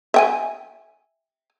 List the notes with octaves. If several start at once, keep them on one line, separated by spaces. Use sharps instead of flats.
E5 G5 G#5